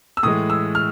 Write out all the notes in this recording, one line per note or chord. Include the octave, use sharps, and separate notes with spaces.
E6
A2 E3 G#3 D#6
E6
F6